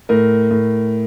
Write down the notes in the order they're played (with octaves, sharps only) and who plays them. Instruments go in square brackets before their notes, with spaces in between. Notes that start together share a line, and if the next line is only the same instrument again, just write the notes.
[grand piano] A2 A#4
A2